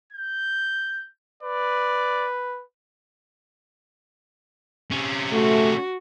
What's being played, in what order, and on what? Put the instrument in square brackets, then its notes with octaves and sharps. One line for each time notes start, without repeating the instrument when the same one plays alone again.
[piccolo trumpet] G6
[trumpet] B4 [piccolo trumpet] D5
[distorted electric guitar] C3 C#4
[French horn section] A3 [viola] F#4